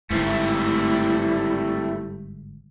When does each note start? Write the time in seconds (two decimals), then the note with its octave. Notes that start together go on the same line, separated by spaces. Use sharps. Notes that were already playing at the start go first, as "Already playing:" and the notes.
0.11 G1 G#2 G3 A3 C4 E4